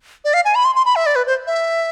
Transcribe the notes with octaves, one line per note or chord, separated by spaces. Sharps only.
D5
F5
G#5
B5
C6
C6
B5
E5
D5
B4
C5
E5